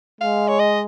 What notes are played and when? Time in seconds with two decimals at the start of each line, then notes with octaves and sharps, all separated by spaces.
0.21 G#3 F5
0.48 C#5
0.59 D#5